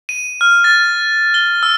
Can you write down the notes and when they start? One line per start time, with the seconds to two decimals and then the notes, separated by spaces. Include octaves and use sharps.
0.09 D#7
0.41 F6
0.64 A6
1.34 G7
1.63 E6